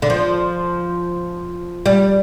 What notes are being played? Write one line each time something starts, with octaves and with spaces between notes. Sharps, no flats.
D3
F3
G3